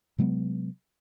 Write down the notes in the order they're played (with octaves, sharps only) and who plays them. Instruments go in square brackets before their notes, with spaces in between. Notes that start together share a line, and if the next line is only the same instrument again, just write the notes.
[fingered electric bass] C3 F#3 G#3 B3